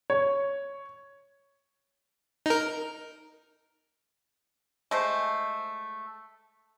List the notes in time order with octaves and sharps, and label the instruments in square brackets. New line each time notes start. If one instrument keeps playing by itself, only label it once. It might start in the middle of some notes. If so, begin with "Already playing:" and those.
[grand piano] C#5
[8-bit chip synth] D#4 A#4
[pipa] G#3 A3 C5